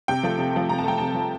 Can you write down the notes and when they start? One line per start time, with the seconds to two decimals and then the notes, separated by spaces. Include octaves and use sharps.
0.08 C3 G5
0.23 F3 A3
0.39 C3
0.54 F3 A3
0.69 C3 A#5
0.79 A5
0.84 F3 A3 G5
0.98 C3 A5
1.15 F3 A3